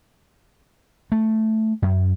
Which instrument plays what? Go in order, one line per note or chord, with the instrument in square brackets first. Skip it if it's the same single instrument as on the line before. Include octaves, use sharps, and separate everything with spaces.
[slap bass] A3
F#2